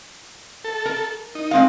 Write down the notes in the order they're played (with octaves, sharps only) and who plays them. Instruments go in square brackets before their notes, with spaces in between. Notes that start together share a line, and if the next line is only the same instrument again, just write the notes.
[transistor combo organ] A4
[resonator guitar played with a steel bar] A#4
[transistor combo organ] D#4
[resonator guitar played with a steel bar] G#3 C4 F5